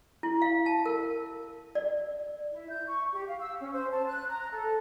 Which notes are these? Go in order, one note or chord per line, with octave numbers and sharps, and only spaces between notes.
E4
F5
A5
A#4
D5
E4
G6
C#6
G4
F5
E6
C#4
C5
A5
F#6
A#5
A4